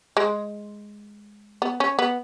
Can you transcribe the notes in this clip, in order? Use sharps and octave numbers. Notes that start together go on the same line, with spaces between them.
G#3
B3
C#4
B3